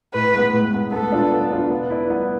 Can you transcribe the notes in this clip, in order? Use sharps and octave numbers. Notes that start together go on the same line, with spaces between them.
A2 B4
G#3 B3
A2
G#3 B3
B3 A4
D4 F4
B3
D4 F4
B3
E4 B4 D5
B3